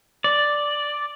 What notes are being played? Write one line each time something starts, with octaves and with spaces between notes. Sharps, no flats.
D5